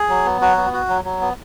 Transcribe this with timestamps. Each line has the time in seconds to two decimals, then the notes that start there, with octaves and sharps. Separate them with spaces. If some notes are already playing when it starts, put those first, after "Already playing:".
Already playing: G#4
0.09 F#3
0.26 B3
0.41 F#3 F#4
0.57 B3
0.73 F#4
0.89 F#3
1.04 F#3
1.21 B3